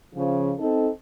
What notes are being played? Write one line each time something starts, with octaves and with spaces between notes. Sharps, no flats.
C#3 F3
C4 D#4 A4